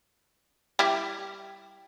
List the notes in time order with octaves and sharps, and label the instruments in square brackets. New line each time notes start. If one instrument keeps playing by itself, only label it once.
[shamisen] G3 E4 G4